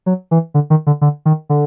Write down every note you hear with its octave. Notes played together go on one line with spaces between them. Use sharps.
F#3
E3
D3
D#3
D3
D3
D#3
D3